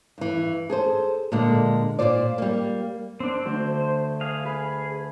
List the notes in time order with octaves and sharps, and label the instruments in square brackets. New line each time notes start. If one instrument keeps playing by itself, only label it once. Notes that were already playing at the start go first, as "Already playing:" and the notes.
[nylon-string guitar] G2 E3
G#4 A4 C5
A#2 D3 G#3 A#3
A#2 C#3 F4 C5 D5
G3 A#3
[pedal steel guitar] C4 D4
[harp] D2 D4 [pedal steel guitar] C5
[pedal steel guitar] G#4 F5
[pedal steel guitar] G#4 [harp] B4